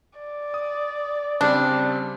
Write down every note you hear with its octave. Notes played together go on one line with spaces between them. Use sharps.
D5
D#6
C#3 G3 C4 D4